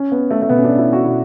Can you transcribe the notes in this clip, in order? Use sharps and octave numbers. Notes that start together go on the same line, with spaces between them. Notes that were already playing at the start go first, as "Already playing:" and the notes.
Already playing: C#4
B3
A3
A3
B2 B3
C#4
D4
E4
F#4
B2 E4